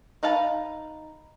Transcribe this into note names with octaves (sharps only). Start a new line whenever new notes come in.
D#4 B4 F5 A5